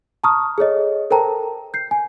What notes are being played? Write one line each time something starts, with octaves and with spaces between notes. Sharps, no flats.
A5 A#5 C#6 D#6 F6
G#4 A4 C#5 D#5
A4 A#4 C5 G5 A5 A#5
G6 C7
G#5